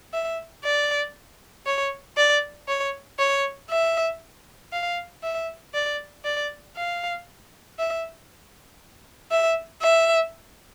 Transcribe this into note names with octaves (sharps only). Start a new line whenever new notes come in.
E5
D5
C#5
D5
C#5
C#5
E5
F5
E5
D5
D5
F5
E5
E5
E5